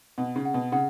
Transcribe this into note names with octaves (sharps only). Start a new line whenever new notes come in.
B2 F#5
C#3
F#5
B2
C#3 F#5